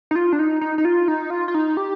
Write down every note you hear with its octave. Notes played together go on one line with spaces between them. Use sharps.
D#4
F4
D4
D#4
D#4
D#4
F4
D#4
F4
F4
D#4
G4